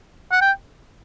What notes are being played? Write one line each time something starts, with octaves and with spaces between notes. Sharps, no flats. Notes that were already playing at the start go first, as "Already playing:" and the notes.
F#5
G5